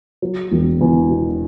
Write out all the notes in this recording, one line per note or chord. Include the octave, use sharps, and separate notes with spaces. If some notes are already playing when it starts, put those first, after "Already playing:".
F#3
E1
E2
B2